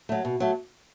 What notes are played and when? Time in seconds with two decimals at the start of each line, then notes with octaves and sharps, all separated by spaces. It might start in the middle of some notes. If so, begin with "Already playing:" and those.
0.09 F#3 A3
0.25 B2
0.40 F#3 A3